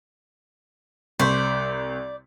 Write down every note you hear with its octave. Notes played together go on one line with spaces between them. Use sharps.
C2 C5 D5 C#6 B6